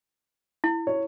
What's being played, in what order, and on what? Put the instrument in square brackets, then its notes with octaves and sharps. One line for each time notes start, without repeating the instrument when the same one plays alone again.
[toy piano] E4
[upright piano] C#5